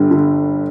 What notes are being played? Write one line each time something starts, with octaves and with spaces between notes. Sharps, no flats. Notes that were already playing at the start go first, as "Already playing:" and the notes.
Already playing: G1 D3 G3
D3